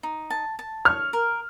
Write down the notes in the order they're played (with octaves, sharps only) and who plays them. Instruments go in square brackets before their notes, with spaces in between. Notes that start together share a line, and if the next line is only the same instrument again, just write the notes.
[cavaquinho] D#4
A5
A5
[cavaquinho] C#5 [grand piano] F6
[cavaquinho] A#4